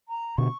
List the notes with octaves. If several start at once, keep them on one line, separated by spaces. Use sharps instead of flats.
A#5
B2 D3 C#6